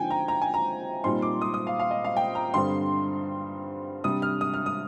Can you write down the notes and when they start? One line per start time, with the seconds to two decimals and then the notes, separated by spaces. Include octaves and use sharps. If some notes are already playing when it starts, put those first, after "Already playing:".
Already playing: D3 F3 C4 D#4 G5 G#5
0.10 A#5
0.28 A#5
0.42 G#5
0.54 A#5
1.04 A#2 G3 C4 D#4 C6
1.22 D6
1.41 D#6
1.54 D#6
1.67 F5
1.79 F5
1.91 D#5
2.04 F5
2.17 G5
2.35 A#5
2.54 G2 D3 G3 C4 C6
4.04 C3 G3 D4 D#6
4.22 F6
4.41 D#6
4.54 F6
4.66 D#6